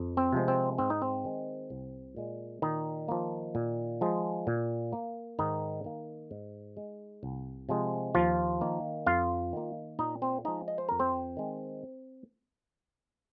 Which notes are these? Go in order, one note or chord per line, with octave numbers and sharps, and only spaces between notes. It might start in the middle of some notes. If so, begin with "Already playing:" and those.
Already playing: F2
C4
C3 F3 G#3
C4
G#2 C4
D#4
C4
D#3 G#3
C2
A#2 G#3
A#2 D#3 D#4
F3 A#3
A#2
F3 G#3
A#2
A#3
G#2 D#3 D#4
D#3 A#3
G#2
G#3
C2
C3 F3 G#3
D#2 F3 F4
D#3 A#3
F2 F4 F5
D#3 A#3
A#2 D#4 D#5
C4 C5
F3 G#3 D#4 D#5
D#5
C5
F2 A#4
C4 C5
D#3 G#3